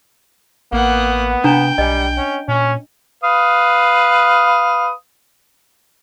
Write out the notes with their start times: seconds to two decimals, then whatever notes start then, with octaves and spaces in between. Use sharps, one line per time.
0.72 A1 A#3 B3 F#5
1.44 C3 D4 G5 A#5
1.78 B1 G3 D#5 G#5
2.17 C#4
2.48 A#2 C#4
3.24 B4 F5 D#6